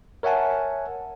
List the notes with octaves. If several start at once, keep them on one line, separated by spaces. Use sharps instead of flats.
A#4 C#5 E5 F#5 G#5 A5